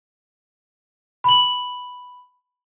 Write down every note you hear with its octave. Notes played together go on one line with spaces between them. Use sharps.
B5 F#7